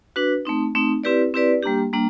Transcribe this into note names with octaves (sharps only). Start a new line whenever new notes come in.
D4 F#4 B4
A3 C4 D#4
A3 C4 D#4
C4 E4 G4 B4 D5
C4 E4 G4 B4 D5
G3 A#3 D4 G4
G3 A#3 D4